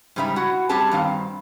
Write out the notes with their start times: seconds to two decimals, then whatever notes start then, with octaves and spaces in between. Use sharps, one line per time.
0.16 G#2 C#3 G3 D#4 E5
0.36 E4 F#4 F#5
0.69 F#2 G3 C4 G4 G#4 A5
0.91 G2 D#3 C4 F5